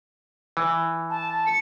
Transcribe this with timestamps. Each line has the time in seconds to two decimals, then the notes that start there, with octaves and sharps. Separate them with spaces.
0.57 E3
1.10 A5
1.47 C#7